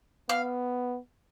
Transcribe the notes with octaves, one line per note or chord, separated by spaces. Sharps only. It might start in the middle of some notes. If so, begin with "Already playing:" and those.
B3 F5